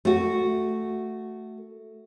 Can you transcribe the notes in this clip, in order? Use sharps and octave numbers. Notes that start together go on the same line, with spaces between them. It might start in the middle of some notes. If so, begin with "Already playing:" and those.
A3 F#4